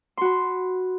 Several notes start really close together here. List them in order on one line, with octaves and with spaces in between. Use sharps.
C6 F#4 B5